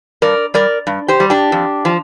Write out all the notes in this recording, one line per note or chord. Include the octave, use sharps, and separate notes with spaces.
G2 A#4 D5
G3 A#4 D5
G2
G4 C5
G3
D4 G4
F2
F3